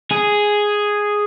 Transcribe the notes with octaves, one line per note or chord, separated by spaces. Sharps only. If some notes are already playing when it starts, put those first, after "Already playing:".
G#4